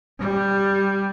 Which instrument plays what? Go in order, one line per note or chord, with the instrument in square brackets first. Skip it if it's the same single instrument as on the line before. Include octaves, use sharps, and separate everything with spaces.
[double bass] G3